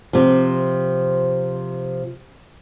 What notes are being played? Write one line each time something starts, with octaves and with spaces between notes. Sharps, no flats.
C3 F3